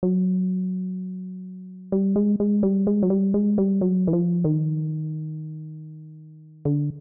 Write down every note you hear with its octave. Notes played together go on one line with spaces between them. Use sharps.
F#3
G3
G#3
G#3
G3
G#3
F#3
G3
G#3
G3
F#3
E3
F3
D#3
D3